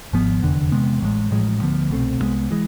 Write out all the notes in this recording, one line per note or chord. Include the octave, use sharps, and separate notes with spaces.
G#1 G#2 F3 B3
F1 E2 D3
E2 C3 G#3 B3
A1 A2 G#3
A1 A2 F3 G#3
D2 D3 F3 B3
C2 B2 A3 C4
C2 B2 G#3 B3
E3 G#3